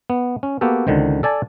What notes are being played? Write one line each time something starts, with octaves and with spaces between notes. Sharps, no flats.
B3
C#4
A#3 B3 F#4 G4 A4
C#2 D3 D#3 C5
A4 D5 G#5 A5